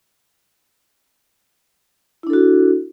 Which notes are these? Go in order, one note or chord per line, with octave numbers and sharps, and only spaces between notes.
D4 E4 F#4 A4